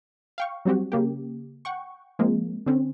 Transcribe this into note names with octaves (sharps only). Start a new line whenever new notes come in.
F5 G5 C#6
F#3 G3 C4 F#4 G4
C#3 A#3 G4
F#5 G5 C#6
F3 G#3 A#3 C4
D3 C4 C#4